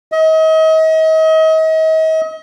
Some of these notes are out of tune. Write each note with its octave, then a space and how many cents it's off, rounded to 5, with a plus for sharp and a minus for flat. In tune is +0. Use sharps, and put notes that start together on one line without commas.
D#5 +40